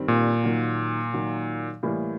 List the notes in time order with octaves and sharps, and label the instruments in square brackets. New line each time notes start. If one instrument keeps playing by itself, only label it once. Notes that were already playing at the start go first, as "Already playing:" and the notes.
Already playing: [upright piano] G2 D#3 G3 C4
[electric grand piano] A#2
[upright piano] D#3 F#3 A#3
D#3 F#3 A#3
A2 E3 G3 A#3